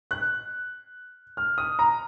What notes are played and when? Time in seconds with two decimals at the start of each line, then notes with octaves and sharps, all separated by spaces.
0.11 F#6
1.37 F6
1.58 D#6
1.79 A#5